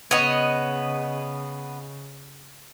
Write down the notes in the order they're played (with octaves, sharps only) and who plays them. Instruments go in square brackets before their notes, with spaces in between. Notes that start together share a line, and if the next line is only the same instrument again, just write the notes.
[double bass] C#3 [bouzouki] B3 [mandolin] C#5 D#5